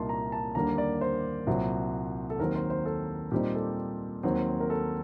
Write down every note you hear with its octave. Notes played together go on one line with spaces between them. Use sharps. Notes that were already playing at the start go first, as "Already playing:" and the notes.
Already playing: C2 A#2 G3 A#3 D#4 A5 C6
A#5
A5
D#2 D3 G3 A#3 D4 A#5
D5
C5
C2 A#2 F#3 C4
A4
D#2 D#3 F#3 C4 A#4
C5
C5
A4
A#2 G3 C4 D#4 G4
A4
D#2 D#3 F#3 C4
A#4
A4